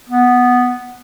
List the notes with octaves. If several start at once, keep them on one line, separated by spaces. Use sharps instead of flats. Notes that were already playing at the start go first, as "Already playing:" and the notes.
B3